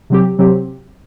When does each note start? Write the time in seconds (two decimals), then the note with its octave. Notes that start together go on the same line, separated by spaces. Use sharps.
0.10 C3 F#3 C4 G4
0.39 C3 F#3 C4 G4